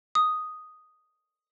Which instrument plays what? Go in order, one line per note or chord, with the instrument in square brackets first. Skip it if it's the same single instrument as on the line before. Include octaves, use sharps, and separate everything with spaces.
[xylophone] D#6